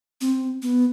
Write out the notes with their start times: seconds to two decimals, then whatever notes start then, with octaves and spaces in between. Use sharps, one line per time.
0.21 C4
0.62 B3